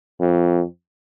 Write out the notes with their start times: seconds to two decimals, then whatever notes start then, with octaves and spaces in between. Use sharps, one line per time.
0.20 F2